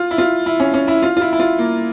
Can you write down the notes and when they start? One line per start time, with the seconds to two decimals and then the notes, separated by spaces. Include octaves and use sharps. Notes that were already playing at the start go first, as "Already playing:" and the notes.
Already playing: F4
0.11 E4
0.18 F4
0.46 E4
0.60 C#4
0.74 C#4
0.88 E4
1.03 F4
1.17 F4
1.21 E4
1.33 E4
1.40 F4
1.59 A#3